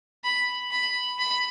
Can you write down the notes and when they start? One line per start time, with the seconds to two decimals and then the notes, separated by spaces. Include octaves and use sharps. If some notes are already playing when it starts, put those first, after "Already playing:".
0.24 B5
0.71 B5
1.19 B5